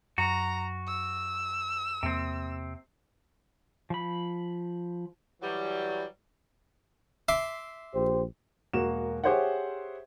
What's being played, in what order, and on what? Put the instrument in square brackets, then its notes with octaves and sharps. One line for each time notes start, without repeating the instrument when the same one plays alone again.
[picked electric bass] F#2 [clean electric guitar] F#4 [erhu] A#5
[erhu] E6
[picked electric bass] E2 A#3 [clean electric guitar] C3 C4
[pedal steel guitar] F3 B5
[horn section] E3 F#3 G3
[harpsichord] E5 C6 D6
[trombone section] A#1 G4 C5
[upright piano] E1 A#3 F#4 E7
G4 G#4 C5 C#5 E5 F#5